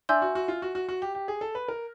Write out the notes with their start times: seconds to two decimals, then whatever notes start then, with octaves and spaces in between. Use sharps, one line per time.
0.09 D4 E5 G#5 C6 E6 G6
0.22 F#4
0.35 F#4
0.48 F4
0.62 F#4
0.75 F#4
0.89 F#4
1.02 G4
1.15 G4
1.28 G#4
1.41 A4
1.55 B4
1.68 A#4